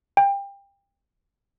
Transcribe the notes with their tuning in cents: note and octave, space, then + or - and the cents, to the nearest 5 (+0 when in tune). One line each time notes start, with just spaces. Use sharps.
G5 +25